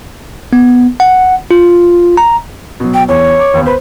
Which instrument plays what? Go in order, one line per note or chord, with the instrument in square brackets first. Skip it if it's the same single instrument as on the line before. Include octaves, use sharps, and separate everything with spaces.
[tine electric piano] B3
F#5
F4
A#5
[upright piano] B2 F#3
[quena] G5
[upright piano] E2 [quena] C#5
[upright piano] D6
D#2 B3
[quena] B4 [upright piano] C5